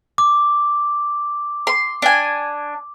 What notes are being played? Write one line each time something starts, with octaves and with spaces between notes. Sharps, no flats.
D6
C6
D4 G#5